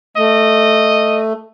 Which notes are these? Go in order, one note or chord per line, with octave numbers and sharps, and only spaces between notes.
A3 D#5